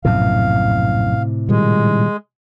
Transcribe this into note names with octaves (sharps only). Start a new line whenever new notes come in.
A#1 F#2 A2 C3 F5
A#2 D#3 G3 G#3